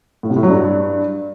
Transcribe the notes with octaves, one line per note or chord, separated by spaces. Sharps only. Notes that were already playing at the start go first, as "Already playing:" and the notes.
A2
C3
A2
F#3
G2